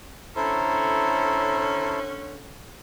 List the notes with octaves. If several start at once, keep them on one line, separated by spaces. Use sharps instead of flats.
D3 C#4 E4 A4 C5 A#5